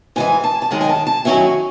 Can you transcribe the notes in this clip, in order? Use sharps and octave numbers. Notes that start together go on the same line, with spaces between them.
G#2 E3 G#3 G#5
A5
A5
F#2 D#3 G#3 D#4 G#5
G#5
A5
A5
D#3 F#3 C#4 E4 G#5